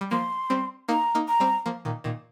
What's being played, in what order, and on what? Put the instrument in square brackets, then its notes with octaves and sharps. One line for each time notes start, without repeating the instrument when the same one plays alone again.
[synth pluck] G3
[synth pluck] F3 A#3 [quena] C6
[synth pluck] G3 C4
[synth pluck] A#3 D#4 [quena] A#5
[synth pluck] A#3 D#4
[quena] A#5
[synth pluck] G3 C4
F3 A#3
A#2 D#3
A#2 D#3